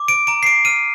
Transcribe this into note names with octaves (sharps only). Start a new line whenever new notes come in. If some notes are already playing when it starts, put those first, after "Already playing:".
Already playing: D6
D7
A#5 D7
C7
D7
F6 D#7